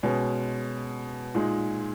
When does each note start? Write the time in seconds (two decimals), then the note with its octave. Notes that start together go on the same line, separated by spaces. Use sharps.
0.03 B2 G#3 C#4
1.35 A#2 G#3 D#4